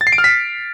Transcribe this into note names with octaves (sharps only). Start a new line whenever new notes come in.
A6
C7
D7
F6
B6